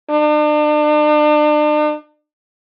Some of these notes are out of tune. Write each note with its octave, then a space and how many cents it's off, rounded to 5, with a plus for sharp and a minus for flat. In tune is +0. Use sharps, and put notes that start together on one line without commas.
D4 +40